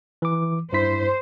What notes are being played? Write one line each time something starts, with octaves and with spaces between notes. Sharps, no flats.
E3 D6
G2 E4 C5 B6